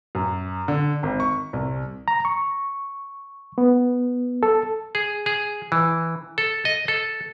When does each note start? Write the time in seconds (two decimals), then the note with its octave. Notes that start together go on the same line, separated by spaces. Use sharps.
0.15 F#2
0.68 D3
1.03 G#1
1.20 C#6
1.53 C2
2.08 A#5
2.25 C#6
3.58 B3
4.43 A4
4.95 G#4
5.26 G#4
5.72 E3
6.38 A4
6.65 D#5
6.88 A4